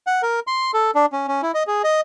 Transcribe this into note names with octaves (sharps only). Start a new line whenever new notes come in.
F#5
A#4
C6
A4
D4
C#4
C#4
E4
D#5
G#4
D#5